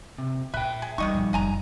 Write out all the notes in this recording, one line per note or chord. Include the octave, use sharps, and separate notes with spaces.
C3
A#2 B4 E5 G5
G#4
C3 E3 G3 D#4 D#5 C#6
A#2 F3
F#1 D#5 G#5 A#5